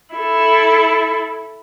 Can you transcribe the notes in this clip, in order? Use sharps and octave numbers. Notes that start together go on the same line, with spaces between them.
E4 A4